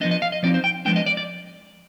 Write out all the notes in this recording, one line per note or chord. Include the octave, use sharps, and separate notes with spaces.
F3 B3 D4 D#5
D#5
F5
D#5
F3 C4 D#4 D5
C5
G5
F3 G#3 B3 D4 G5
D#5
D5
D5